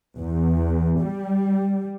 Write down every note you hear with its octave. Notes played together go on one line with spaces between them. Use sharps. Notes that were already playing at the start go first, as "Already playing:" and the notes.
E2
G3